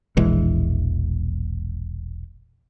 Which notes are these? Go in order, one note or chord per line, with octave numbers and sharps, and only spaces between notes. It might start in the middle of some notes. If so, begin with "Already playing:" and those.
E1 A#1 E3 G#3